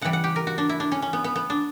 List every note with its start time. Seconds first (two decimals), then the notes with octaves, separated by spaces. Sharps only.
0.01 C#3 E3 G3 F#5
0.13 F#5
0.24 G4
0.36 A#4
0.47 F#4
0.58 D4
0.69 E4
0.80 D4
0.92 C#4
1.02 C#4
1.13 B3
1.24 B3
1.36 B3
1.50 D4